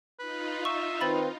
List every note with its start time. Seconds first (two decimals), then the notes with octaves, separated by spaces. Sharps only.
0.19 D#4 F4 B4
0.65 E5 C#6
1.01 D#3 C4 B4 B5 A6 F#7